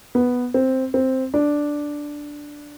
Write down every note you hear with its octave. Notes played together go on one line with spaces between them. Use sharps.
B3
C4
C4
D4